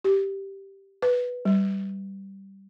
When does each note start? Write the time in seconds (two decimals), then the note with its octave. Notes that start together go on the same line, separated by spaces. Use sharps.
0.04 G4
1.02 B4
1.45 G3